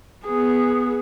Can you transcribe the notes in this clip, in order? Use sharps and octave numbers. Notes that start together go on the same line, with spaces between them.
B3 G#4